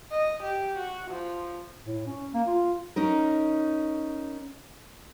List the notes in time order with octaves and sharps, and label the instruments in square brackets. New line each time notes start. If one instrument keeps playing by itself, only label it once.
[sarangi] D#5
G4
F#4
F3
[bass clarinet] A2
C#4
A#3
F4
[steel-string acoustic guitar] C#4 D#4 A#4